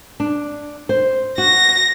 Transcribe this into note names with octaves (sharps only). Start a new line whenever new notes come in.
D4
C5
F#4 A#6